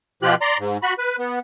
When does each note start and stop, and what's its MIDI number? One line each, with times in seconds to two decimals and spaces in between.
0.23 0.35 47
0.23 0.35 53
0.23 0.35 65
0.23 0.35 67
0.23 0.35 90
0.41 0.57 74
0.41 0.57 82
0.41 0.57 84
0.59 0.77 44
0.83 0.94 66
0.83 0.94 83
0.98 1.16 71
1.19 1.39 59